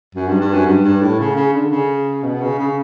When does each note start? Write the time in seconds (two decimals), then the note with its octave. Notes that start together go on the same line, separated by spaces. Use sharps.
0.15 F#2
0.28 G2
0.41 G2
0.54 F#2
0.66 G2
0.84 G2
1.02 A2
1.20 C#3
1.36 C#3
1.53 D3
1.71 C#3
2.23 B2
2.41 C#3
2.59 C#3